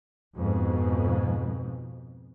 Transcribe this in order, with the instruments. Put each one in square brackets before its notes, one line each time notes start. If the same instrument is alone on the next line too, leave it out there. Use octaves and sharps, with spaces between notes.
[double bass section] F2 G#2 B2